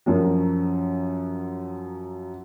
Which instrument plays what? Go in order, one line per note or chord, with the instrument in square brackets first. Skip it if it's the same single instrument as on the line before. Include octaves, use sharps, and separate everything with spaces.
[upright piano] F#2 F3 F#3